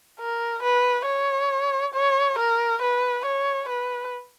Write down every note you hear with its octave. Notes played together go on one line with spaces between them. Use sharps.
A#4
B4
C#5
C#5
A#4
B4
C#5
B4